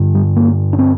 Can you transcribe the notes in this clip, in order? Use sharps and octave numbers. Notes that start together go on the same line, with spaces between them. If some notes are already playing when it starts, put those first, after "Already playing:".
Already playing: G2 D3
G3
A#3
D4
C4